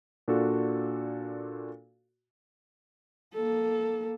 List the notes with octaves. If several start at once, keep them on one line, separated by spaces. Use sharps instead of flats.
A#2 D4 F4 F#4 A4
A#3 A4